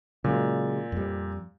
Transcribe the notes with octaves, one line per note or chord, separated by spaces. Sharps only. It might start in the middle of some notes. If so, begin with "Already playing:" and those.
A#2 C#3 F#3 G#3
F2 G3